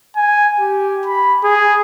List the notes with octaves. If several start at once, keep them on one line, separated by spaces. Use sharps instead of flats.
G#5
G4
B5
G#4